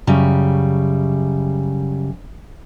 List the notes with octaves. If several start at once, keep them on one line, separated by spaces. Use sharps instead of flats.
F#2 C#3 G3